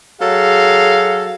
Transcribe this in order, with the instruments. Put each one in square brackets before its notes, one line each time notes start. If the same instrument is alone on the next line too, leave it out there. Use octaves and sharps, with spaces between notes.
[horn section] F#3 G#4 A4 F5